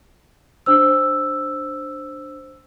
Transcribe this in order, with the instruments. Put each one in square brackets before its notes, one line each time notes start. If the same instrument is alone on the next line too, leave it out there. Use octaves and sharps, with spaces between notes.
[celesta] D4 C5 E6